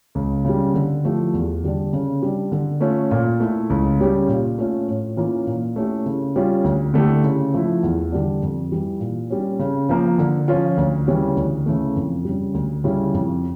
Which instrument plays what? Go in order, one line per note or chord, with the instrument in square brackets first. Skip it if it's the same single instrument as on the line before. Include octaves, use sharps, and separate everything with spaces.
[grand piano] C#2
C#3 G3
D3
F3 A3 E4 G4
E2
D3 G3 D4
C#3
G3 D4
D3
A3 C#4 F4
A#2
A3 E4
C#2
C#3 G3 C#4 G4
A#2
A3 C#4 F4
A2
E3 A#3 C#4 F4
A#2
A3 C#4 E4 G4
C#3
G3 C#4 F4
D2
D3 A3 E4 G4
C#3
F3 A3 E4
E2
D3 G3 D4
F2
E3 G3
A#2
G3 C#4
C#3
F3 A#3
D3
F3 C#4 F4
D2
C#3 E3 G3 C#4
D2
C#3 E3 A3
F2
C#3 G3
D2
C#3 G3 C#4 E4
F2